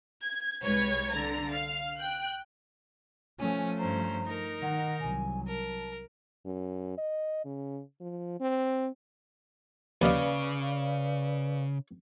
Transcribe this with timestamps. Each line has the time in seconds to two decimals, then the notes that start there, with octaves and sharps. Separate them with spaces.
0.22 G#6
0.62 C2 G#3 B4 C#5 G#6
1.13 D3 A#5
1.52 F5
1.99 G5 F#6
3.39 F3 A3 C#4 G#5
3.77 G2 C#4 C5 A#5
4.24 D#4 A#4
4.61 D#3 F#5
4.99 C2 F#3 G#5
5.47 A#4 A5
6.46 F#2
6.98 D#5
7.45 C#3
8.01 F3
8.41 C4
10.02 D#2 C#3 B4 D5 D#5 F5